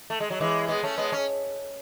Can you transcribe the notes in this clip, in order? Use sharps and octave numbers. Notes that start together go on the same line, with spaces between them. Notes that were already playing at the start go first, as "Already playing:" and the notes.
A3
G#3
F#3
E3 G#3
G#3 B3
A3 C#4
G#3 B3
C#4